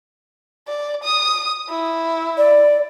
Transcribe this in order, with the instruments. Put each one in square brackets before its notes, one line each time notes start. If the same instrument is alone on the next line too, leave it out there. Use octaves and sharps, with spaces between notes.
[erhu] D5
D#6
E4
[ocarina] D5